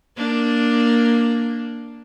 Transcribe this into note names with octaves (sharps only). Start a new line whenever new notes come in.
A#3 D4